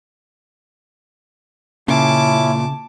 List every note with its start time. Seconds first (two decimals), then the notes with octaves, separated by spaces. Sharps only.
1.88 A#2 C#3 C#4 E4 A5 D6